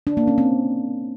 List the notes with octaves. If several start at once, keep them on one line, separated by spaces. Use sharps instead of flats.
D4
A#3
C#4
C4